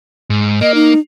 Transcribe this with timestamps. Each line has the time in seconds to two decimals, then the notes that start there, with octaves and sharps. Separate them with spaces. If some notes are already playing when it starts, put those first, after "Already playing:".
0.30 G#2
0.61 A#3 D#5
0.75 D#4